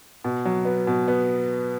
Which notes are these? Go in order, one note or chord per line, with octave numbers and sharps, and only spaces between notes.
B2
F#3
B3
B2
B3